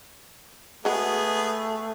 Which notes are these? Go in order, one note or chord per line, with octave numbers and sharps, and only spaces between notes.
G#3 A3 B3 F#4 G#4